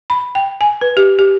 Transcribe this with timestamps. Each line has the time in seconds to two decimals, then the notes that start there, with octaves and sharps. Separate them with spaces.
0.10 B5
0.35 G5
0.61 G#5
0.81 B4
0.97 G4
1.19 G4